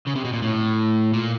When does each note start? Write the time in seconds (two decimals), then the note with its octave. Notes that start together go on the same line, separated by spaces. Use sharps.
0.07 C#3
0.15 C3
0.25 B2
0.33 A#2
0.42 A2
1.13 A#2